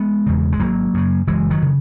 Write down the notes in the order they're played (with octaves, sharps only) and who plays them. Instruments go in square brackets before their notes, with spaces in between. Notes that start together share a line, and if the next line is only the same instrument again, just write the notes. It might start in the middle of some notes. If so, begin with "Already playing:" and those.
Already playing: [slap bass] G#3 B3
E2 C#3
G#3
G#1 F#3 A#3
F#2 C#3
F#1 E3 G#3
D#3 F#3
C#3